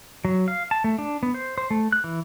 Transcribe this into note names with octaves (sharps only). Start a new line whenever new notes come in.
F#3
F5
A5
A3
D4
B3
C5
C5
A3
F#6
E3